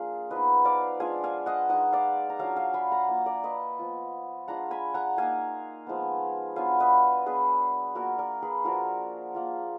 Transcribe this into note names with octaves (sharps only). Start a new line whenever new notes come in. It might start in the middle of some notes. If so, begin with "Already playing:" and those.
Already playing: F3 A#3 D4 F4 G#4
F3 B3 D#4 B4 D#5
D5 F5
G#3 D4 F4 F5 G#5
F5 G#5
D#5 F#5
G#3 D#4 D#5 F#5
D5 F5
A#5
F#3 D4 F4 F5 G#5
F5 G#5
G#5 B5
F#5 A#5
A#3 F4
A#4 D5
B4 D#5
F3 B3 F4
G#3 D4 F4 F#5 A#5
G#5 B5
F#5 A#5
A#3 D#4 F5 G#5
F3 G#3 B3
F#3 B3 D4 F4 F5 G#5
B4 D#5
F#3 B3 D4 G#4 B4
A#3 D4 F4 F#4 A#4
A#4 D5
G#4 B4
F3 A#3 D4 F4 F#4 A#4
A#3 F4